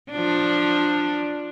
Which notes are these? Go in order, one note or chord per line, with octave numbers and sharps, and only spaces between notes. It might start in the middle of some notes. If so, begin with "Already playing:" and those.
F3 D4